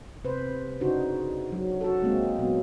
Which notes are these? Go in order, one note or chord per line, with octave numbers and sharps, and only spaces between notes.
C3 B4 C5
C#3 D4 D#4 F#4 C5
F#3
F#4 A4
G#3 A#3 C4
A#2 F#3 B3